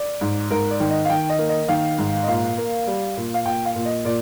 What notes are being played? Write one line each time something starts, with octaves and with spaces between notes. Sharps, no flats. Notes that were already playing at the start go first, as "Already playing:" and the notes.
Already playing: D5
G#2
G#2 A#4
D5
D#3
D#5
F5
D#3 G5
D#5
A#3
D#5
D#3 F5
G#2
D#5
A#2 F5
A#3
G3
A#2
F5
A#2 G5
F5
A#2
D#5
A#2 D5